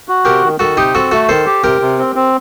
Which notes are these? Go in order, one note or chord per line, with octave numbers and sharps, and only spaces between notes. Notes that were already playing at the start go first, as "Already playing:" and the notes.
F#4
C3 G4 A#4
D#3
D#3 F#4 A4
C3 D#4 G4
C4 F#4 A4
A3 F#4 A4
D#3 A4 C5
G4
C3 G4 A#4
C3
C4
C4